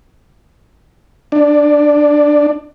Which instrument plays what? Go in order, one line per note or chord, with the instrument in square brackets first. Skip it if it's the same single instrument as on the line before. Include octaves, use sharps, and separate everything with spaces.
[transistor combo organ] D4